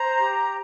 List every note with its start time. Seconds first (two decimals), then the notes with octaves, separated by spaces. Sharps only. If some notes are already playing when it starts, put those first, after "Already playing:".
Already playing: C5 A#5
0.19 G4